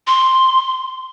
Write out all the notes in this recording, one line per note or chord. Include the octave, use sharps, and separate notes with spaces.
C6